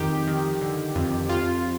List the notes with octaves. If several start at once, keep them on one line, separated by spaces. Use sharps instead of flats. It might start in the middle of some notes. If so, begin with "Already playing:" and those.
Already playing: F2 D#3 G4
D#3
D3
F2
F2 F4